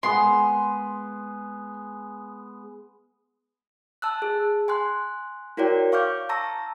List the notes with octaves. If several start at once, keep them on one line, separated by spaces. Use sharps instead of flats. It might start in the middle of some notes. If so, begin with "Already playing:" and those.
G#3 B3 C6
A5 E6 F#6
G#4
G#5 C6 F#6
E4 F#4 A#4 C#5 D5 G5
F5 C#6 D6 F6 G6
A5 A#5 C#6 E6 A#6